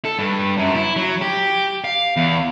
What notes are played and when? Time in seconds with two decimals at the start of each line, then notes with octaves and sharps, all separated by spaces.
0.05 A4
0.19 G2
0.58 F#2
0.75 E4
0.96 F#3
1.21 G4
1.84 F5
2.17 E2